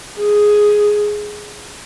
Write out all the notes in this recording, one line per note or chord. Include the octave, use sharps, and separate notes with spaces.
G#4